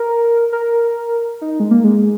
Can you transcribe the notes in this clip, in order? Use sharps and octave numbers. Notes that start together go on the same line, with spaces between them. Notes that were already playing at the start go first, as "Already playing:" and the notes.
Already playing: A#4
A#4
D#4
G#3
A#3
G#3